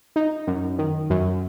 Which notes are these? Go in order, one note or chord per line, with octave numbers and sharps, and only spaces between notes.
D#4
F#2
D#3
F#2